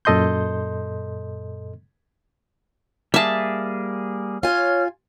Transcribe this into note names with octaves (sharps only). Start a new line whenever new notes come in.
F#2 A#2 A4 D#5 C6 G6
G3 A#3 G#4 E5 A5
F4 C#5 G#5 F6